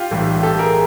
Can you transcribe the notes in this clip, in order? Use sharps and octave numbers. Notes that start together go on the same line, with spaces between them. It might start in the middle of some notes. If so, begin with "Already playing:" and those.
Already playing: F4 G4
B1 A2 E3 G3
G4 A4
G#4 A#4